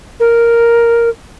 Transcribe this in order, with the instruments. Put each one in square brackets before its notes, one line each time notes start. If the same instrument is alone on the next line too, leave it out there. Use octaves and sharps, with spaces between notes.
[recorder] A#4